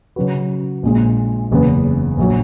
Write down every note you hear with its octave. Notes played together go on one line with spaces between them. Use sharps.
C#3 F#3 C#4 F#4 B4
A#1 A#2 G#3
F#1 E2 C#3 E3 B3
A#1 F#3